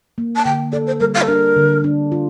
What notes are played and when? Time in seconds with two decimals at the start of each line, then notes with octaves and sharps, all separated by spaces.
0.18 A#3
0.36 A5
0.45 D3 G5
0.72 A4 D5
0.87 C5
1.00 G3 A#4
1.14 F5
1.22 A4
1.28 D4 A#4
1.56 D3
1.84 D4
2.12 F4